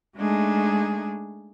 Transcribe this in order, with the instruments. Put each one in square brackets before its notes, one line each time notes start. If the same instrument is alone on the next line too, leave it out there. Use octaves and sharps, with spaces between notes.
[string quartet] G#3 A3 D4 D#4 G#4